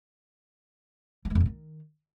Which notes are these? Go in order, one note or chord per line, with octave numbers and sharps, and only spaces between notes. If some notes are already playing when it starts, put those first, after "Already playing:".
G3
G#3
F2
A#2
D#3